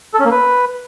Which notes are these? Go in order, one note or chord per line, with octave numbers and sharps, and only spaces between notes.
A4
C#4
A#3
B4